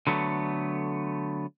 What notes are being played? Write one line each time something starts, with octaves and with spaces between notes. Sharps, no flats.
D3 F#3 A3 B3